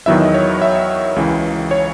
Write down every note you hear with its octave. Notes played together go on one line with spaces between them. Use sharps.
E2 D#3 F#3 B3 E4 E5
D#5
C#5
E5
C#2 C#3 E3
C#5